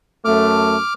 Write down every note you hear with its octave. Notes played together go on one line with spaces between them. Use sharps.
F#2 A3 D6 F6